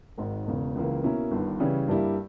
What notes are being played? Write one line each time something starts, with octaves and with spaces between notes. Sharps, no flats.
G#1 G#2 D#3
E1 E2 C#3
C#2 C#3 E3 A#3
B2 A#3 C#4 E4 A#4
G1 G2 D#3
C#3 E3 G3 C#4
G2 G3 A#3 E4 G4